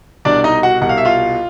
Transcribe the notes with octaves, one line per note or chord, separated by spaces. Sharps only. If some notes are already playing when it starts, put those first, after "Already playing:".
C2 B2 G3 D4 D5
D#4 D#5
F#4 F#5
C2 B2 G3 F#5
F5
E5
F4 F5